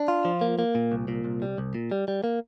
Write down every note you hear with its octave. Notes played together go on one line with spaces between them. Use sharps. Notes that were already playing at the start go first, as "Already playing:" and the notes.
Already playing: D4
F4
F3
A#3
A#3
A#2
C2
A#2
C2
G3
C2
A#2
G3
G3
A#3